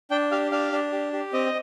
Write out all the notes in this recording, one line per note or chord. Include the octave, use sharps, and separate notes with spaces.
D4 G5
G4 F5
D4 F5
D4
G4
G4
C4 D#5